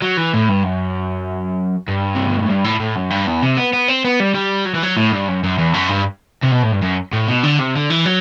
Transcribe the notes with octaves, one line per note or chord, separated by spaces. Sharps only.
F#3
E3
A2
G2
F#2
G2
C3
B2
A2
G2
A2
A2
F#2
G2
E2
C3
B3
B3
C4
B3
G3
G3
F#3
E3
F#3
A2
G2
F#2
F#2
E2
F#2
G2
C3
B2
A2
G2
F#2
A2
B2
D3
C3
D3
E3
F#3